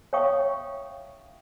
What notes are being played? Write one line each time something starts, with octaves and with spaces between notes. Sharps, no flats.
C#5 E5 F5 G5 C#6 D#6